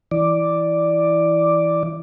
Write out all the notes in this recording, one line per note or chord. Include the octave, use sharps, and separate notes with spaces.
E3 D5